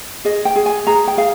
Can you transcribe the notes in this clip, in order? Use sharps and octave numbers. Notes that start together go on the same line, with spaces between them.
G#4 D#5
G5
G#4
G#5
G#4 A#5
G5
G#4 F5